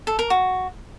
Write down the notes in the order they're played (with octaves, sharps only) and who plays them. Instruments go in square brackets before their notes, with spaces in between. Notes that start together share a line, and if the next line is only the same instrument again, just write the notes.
[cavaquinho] A4
A#4
F#4